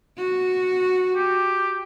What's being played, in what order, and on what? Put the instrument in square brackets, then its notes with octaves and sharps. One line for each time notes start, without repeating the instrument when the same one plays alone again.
[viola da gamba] F#4
[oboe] G4